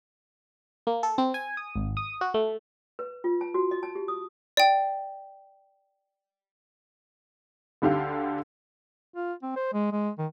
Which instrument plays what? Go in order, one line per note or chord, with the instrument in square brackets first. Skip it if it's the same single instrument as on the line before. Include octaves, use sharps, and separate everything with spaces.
[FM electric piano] A#3
A4
C4
G#5
D#6
G#1
D#6
F#4
A3
[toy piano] B4
F4
A5
F#4
D#5
A5
G4
D#6
[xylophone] D5 G5
[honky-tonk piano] D2 D3 G4 F5
[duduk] F4
C4
C5
G#3
G#3
D#3